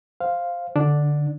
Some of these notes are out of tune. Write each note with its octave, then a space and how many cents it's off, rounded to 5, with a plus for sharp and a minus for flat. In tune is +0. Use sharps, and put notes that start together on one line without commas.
C5 +0 F5 +0
D3 +0 D4 +0